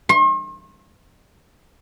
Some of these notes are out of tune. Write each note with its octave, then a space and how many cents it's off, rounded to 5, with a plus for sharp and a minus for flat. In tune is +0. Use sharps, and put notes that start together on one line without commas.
C6 +45